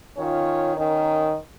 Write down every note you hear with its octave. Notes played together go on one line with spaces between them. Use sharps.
D#3 C#4 F4 C#5
D#3 C#4 A#4 D#5